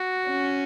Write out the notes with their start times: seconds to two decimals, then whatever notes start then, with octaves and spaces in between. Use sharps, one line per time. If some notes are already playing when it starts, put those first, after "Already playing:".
Already playing: F#4
0.28 C#4